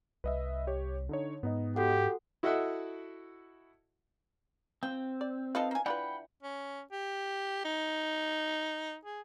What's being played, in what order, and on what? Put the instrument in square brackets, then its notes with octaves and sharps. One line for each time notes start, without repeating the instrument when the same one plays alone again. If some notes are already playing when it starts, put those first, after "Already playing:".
[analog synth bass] C2 [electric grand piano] B4 D#5 E5
[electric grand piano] G4 C#5
D3 D#4 C#5
[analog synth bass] G#2 [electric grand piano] B3 D#4 D#5
[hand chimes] F#4 A4 F#5 [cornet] G4
[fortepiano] E4 F#4 A4 D#5 E5 F#5
[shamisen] F3 [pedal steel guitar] C4 [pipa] G5
[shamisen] D5
[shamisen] D#4 F4 B4 [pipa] A4 D#5 F5
[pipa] A#3 G#5
[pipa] E3 [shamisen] D4 F4 B4 [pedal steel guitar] F#5 G5 B5
[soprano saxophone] C#4
G4
D#4
G#4